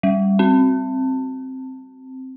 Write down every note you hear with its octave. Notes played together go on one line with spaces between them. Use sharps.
G3
C4